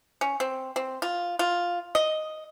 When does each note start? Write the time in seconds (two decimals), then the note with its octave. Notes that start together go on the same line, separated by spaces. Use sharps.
0.21 C#4
0.40 C4
0.76 C4
1.02 F4
1.39 F4
1.95 D#5